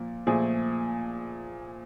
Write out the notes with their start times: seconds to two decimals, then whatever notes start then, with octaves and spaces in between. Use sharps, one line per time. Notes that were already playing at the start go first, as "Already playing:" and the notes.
Already playing: A#2 F3
0.27 A#2 F3 A3 G#4